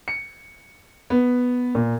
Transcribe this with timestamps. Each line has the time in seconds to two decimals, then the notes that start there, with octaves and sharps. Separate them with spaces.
0.08 C#7
1.10 B3
1.75 A#2